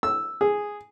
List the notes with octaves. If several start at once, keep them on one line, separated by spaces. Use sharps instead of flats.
E6
G#4